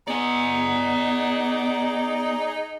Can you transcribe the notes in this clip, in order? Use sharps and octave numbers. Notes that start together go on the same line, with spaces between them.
B3 D#4 G#4 D5 G#5